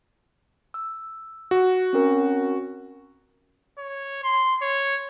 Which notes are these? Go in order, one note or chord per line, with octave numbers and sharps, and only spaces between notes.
E6
F#4
C4 C#4 A#4
C#5
C6
C#5